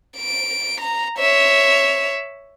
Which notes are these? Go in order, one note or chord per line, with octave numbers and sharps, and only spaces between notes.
D7
A#5
C#5 E5